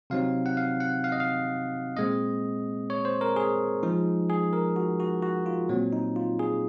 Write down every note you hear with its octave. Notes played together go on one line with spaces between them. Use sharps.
C3 F#3 C4 D#4 F5
F#5
F5
F#5
F5
D#5
F5
A#2 G#3 C4 D#5
C#5
C5
A#4
G#4
F3 G#3 D#4
G#4
A#4
F#4
F#4
F#4
F4
A#2 F#3 C4
D#4
F4
G#4